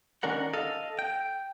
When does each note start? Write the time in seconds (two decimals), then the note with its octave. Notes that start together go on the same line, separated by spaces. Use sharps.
0.23 D#3 C#4 D4 A#4 F#5
0.54 A4 D#5 F5
0.99 G5